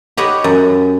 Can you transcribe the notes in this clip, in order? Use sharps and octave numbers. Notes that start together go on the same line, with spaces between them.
G4 C#5 D#5 F#5 B5
F#2